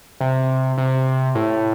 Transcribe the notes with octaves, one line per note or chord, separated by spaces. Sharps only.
C3
C3
A2